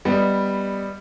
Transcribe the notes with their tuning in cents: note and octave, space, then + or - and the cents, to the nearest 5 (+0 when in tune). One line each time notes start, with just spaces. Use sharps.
G3 +0 B3 +0 D#5 +0